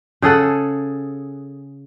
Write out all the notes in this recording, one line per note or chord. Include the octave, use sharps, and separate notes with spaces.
C#3 G#4 A4 F#5